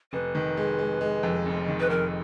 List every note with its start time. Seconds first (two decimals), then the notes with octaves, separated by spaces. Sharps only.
0.12 F1 B4
0.35 D#3
0.57 G#3
0.79 G#3
1.01 G#3
1.23 F2
1.46 F1
1.68 D#3
1.80 B4
1.90 F2 A#4